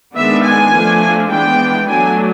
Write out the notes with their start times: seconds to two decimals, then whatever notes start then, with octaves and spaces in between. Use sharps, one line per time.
0.15 D#3 G#3 B3 D4 E5
0.44 G#5
0.73 F3 A3 D4
1.30 E3 G#3 B3 D4 G5
1.88 F#3 A3 D4 G#5